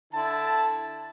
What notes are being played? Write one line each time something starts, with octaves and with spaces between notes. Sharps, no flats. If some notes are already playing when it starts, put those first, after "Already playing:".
D3 E4 A5